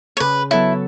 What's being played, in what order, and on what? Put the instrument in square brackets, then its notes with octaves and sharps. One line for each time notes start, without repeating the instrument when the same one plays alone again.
[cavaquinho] C#5
[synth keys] C#3 [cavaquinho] B4
[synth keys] F#3 B3 A4 C#5 [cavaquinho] E4